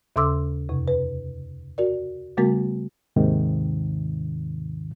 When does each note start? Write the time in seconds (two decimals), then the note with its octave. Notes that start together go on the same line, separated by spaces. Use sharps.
0.16 D#2 C#3 A4 C6 D6 E6
0.69 F2 C3
0.88 B4
1.78 F#4 A#4 D5
2.37 C#3 G3 A3 B3 F#4 A#4
3.16 D#2 G#2 C3 D#3